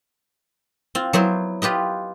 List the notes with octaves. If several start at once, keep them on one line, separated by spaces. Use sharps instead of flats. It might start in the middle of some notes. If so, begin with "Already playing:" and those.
C4 F4
F#3 B3 E4 C5
F4 G4 B4 D#5